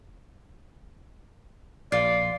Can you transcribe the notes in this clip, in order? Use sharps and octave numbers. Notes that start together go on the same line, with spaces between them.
A#1 F4 D5